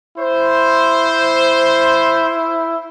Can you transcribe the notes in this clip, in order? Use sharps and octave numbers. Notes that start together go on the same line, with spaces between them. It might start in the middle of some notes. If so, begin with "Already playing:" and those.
E4 C5